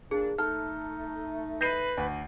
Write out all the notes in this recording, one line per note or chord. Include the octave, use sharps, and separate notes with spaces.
A#2 D4 G#4
A3 D#4 A4 F6
B4 G6 A#6 C7 D#7
D2